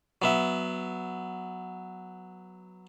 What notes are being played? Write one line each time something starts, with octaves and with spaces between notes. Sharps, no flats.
F#3 B3 E5